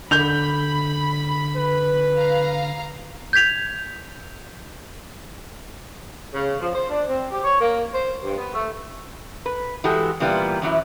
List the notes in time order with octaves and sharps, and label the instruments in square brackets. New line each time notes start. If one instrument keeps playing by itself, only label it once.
[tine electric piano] D3 [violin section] B5 [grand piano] G6 F7
[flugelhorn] B4
[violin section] F5 A#5
[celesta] G6 G#6 B6 F7
[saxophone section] C#3
F3
C5
D4
C4
G4
C#5
A#3
C5
G2
B3
A3
[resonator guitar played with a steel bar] B4
E3 G#3 F#4 G4 A4
A#2 E3 G3 B3 E4 F4
F#2 E3 F#3 E4